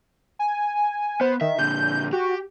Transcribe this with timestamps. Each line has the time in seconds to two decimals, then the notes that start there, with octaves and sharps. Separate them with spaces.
0.39 G#5
1.21 B3 C5
1.41 D#3 E5
1.59 A#2 D3 G6
2.13 F#4 G4